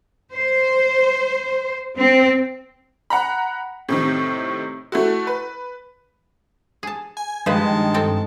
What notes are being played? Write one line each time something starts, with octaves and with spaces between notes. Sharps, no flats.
C5
C4
F#5 A#5 B5
A2 C3 D#3
A3 E4 F#4
B4
G#4 A5
G#5
G2 D#3 F3 G#3 B4 C5 A5
C4 A4 G5